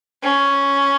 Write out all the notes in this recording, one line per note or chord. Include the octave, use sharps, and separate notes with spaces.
C#4